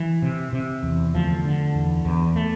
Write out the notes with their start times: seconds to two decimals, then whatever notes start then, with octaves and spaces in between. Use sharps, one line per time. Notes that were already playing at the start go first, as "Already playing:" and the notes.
Already playing: E3
0.22 C3
0.53 C3
0.83 E2
1.14 D2 F3
1.45 D3
1.75 E2
2.05 E2
2.36 A3